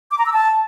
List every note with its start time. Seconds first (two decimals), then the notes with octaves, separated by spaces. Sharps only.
0.11 D6
0.18 A#5
0.26 E6
0.33 A5